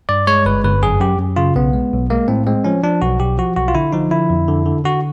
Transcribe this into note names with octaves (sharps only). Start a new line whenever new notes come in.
G2 D5
G#3 C#5
G1 B4
G1 B4
F#2 G#4
F#2 G4
F#2
C#3 F4
B1 B3
G#3
B1
G#3 A#3
A2 C4
G#3 C4
F3 C#4
F3 D4
B1 F#4
B1 G4
F3 F#4
B1 F#4
F4
D3 E4
F3 D#4
D3 E4
F2
D3
D3
D3 F#4